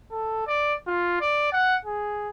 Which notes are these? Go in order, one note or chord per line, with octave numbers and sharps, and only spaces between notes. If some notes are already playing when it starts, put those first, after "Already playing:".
A4
D5
F4
D5
F#5
G#4